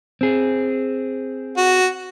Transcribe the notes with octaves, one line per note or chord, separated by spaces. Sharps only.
C4 G#4
F#4